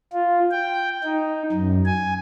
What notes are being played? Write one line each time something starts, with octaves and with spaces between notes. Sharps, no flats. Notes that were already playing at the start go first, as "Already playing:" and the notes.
F4
G5
D#4
F#2
G#5